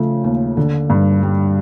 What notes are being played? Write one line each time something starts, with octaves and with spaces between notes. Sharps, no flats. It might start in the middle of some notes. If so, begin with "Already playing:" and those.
Already playing: C#3 F3 A3
D#2
D3
G2
G3